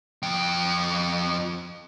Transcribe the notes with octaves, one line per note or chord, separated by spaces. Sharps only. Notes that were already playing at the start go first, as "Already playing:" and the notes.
F2 G5